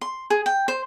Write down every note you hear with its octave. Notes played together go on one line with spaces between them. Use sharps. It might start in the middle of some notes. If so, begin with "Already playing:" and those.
C6
G#4
G5
C5